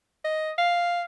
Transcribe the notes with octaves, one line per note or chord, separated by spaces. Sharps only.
D#5
F5